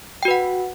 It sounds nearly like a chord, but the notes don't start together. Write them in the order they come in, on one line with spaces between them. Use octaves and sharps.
G5 F#4 B4 F#5